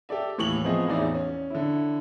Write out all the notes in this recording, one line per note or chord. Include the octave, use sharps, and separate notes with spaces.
G4 A4 D5 E5
D#2 A2 E3 C#6 F7 F#7
F3 B3 C4 G#4 D#5
A1 E2 D#4 D5 E5
C#4
D3 E4